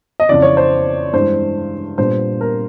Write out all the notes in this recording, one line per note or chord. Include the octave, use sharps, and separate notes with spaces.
D#5
F2 C#3 E3 D5
C#5
C5
G2 E3 G#3 C5
A#2 G3 B3 D4 C5
A#4